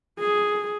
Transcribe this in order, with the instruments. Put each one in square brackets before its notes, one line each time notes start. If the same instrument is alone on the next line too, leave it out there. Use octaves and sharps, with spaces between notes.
[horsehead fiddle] G#4